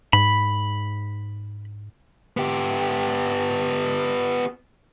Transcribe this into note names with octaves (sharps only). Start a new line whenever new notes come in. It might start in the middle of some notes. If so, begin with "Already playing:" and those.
G#2 B5
B3 G4